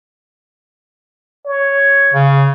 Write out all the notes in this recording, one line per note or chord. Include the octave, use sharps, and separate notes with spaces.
C#5
C#3